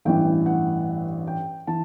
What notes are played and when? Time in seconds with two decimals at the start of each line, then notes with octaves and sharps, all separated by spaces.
0.05 A1 G2 E3 G5
0.46 F#5
1.27 G5
1.67 E3 A5